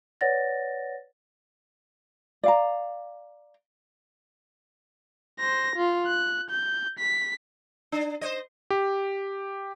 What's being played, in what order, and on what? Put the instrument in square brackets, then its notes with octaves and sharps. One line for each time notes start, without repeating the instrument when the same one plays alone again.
[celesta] B4 C#5 D5 F#5 A6 A#6
[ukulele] D5 F5 A#5
[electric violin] C5 A#6
F4
F#6
G6
B6
[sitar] D4
C5 C#5 D#5
[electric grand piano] G4